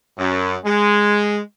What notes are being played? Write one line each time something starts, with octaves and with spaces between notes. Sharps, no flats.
F#2
G#3